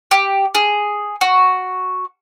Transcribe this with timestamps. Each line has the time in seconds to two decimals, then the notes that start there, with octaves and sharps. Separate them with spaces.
0.11 G4
0.55 G#4
1.21 F#4